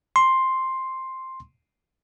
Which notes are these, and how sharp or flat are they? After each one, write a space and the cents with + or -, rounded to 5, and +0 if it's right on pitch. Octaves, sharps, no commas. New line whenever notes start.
C6 +5